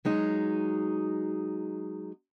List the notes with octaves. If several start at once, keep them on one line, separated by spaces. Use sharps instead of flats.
F#3 G#3 D#4